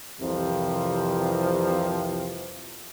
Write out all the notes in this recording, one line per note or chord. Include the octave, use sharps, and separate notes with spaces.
C2 F2 C3 E3 F3